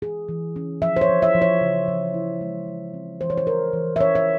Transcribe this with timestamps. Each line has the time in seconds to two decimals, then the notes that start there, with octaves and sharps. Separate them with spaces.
0.02 E3 G#4
0.29 E3
0.56 C#4
0.82 F3 E5
0.96 C5
1.01 C#5
1.09 F3
1.22 E5
1.35 F3
1.42 C#5
1.61 C#3
1.88 F3
2.14 E4
2.41 G#3
2.68 E3
2.94 C4
3.21 E3 C5
3.30 C#5
3.37 C5
3.47 E3 A#4
3.73 E3
3.96 E5
4.00 C#4 C#5
4.15 E5